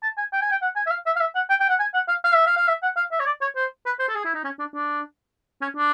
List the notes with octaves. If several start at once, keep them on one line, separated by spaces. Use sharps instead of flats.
A5
G#5
G5
G#5
G5
F#5
G#5
E5
F5
E5
F5
E5
F#5
G5
G5
F#5
G#5
F#5
F5
F5
E5
F5
F5
E5
F#5
F5
E5
C#5
D5
C#5
C5
B4
C5
A4
G#4
E4
D#4
C#4
D4
D4
C#4
D4